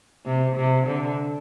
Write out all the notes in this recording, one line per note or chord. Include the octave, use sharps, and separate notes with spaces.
C3
C3
D3